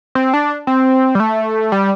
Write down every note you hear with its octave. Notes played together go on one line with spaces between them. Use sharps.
C4
D4
C4
G3
A3
G3